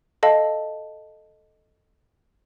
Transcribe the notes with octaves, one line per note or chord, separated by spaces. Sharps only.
A4 D#5 F5 A5